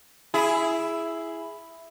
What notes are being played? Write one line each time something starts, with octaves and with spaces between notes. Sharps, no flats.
E4 G#4